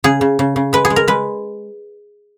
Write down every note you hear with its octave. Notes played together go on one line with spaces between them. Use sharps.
C#3 G#4
C#3
C#3
C#3
G#3 B4
G#4
G#3
A#4
G#3 B4